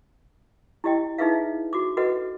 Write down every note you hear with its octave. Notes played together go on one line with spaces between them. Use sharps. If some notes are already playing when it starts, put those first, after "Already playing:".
E4 G4 D#5 G5
D#4 E4 G#4 B4 E5 F5
F#4 D6
F#4 A4 B4 D#5 F#5